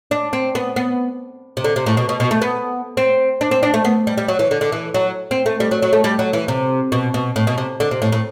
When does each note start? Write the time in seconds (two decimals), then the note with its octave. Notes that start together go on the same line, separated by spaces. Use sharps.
0.11 D4
0.33 C4
0.55 B3
0.76 B3
1.57 C3
1.64 D3
1.76 C3
1.86 A2
1.97 B2
2.09 B2
2.20 B2
2.31 A3
2.42 B3
2.97 C4
3.41 D4
3.51 C4
3.63 D4
3.74 A3
3.85 B3
4.07 G3
4.18 G3
4.28 F#3
4.39 E3
4.51 D3
4.61 D3
4.72 E3
4.94 F#3
5.31 C4
5.46 A3
5.60 G3
5.71 F#3
5.82 F#3
5.93 A3
6.04 G3
6.19 F#3
6.33 E3
6.48 C3
6.92 B2
7.14 B2
7.36 A2
7.47 B2
7.58 C3
7.80 D3
7.91 C3
8.02 A2
8.12 A2